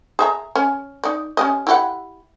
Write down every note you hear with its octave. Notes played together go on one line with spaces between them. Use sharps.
G#4 E5 A#5
C#4
D#4 D5
C#4 G4 D#5
E4 G4 F#5